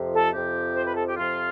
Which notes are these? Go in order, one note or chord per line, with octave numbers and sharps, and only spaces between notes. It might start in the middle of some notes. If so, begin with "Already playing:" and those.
Already playing: F2 C3 F3
A4
F2 C3 F3 G4
C5
B4
A4
G4
F2 C3 F3 F4